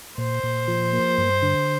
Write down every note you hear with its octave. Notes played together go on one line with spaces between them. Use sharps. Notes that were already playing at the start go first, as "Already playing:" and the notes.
A#2 C5
A#2
F3
A#3
G2
D3